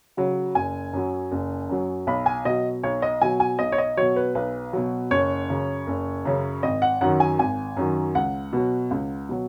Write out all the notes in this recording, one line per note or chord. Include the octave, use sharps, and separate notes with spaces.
C#3 F#3
F#1 G#5
F#2 F#3
F#1
F#2 F#3
B1 B5
G#5
B2 F#3 D#5
B1 C#5
D#5
B2 F#3 G#5
G#5
B1 D#5
C#5
D#5
B2 F#3 C#5
B4
B1 B4
B2 F#3
F#1 C#5
F#2 C#3
F#1
F#2 C#3
G#1 D#5
F#5
F#2 D#3 F#3 F#5
G#5
G#1 G#5
F#2 D#3 F#3
C#2 F#5
B2 F#3
C#2
B2 F#3